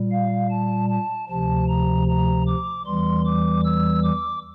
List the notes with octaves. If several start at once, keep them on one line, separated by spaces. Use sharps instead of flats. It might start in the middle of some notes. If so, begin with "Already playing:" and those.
Already playing: A#2 G3
F5
A5
A5
D2 C3 F3 A5
A#5
A#5
D6
E2 E3 G3 C6
D6
E6
D6